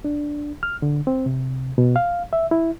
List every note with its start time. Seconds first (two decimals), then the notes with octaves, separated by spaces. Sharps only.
0.05 D4
0.63 F6
0.82 D3
1.07 C4
1.26 C3
1.78 B2
1.96 F5
2.33 E5
2.51 E4